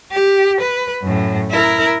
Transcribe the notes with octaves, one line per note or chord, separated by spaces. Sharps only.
G4
B4
F#2 A2
E4 A#4